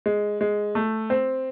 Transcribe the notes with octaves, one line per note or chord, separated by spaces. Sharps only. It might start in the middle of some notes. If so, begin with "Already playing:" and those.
G#3
G#3
A3
C4